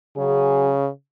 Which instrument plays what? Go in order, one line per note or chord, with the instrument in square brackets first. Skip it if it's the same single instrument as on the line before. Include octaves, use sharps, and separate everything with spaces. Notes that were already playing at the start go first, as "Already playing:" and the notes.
[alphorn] C#3 [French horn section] F#3 C#4 G#4